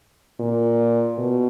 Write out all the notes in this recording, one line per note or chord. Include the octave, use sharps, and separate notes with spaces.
A#2
B2